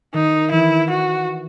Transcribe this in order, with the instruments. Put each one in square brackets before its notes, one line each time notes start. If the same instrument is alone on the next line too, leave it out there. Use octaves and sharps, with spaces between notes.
[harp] D#3 [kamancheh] D#4
[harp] E3 [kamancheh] E4
[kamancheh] F#4